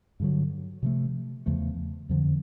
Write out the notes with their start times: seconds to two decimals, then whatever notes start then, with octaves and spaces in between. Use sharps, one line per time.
0.20 G2 D3 F#3
0.83 C3 F3 A3
1.46 E2 C#3 F3 A3
2.09 F2 D3 F3